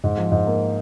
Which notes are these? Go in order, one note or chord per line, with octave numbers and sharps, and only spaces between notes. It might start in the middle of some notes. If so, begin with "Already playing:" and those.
G#2
F3
G#2
A#3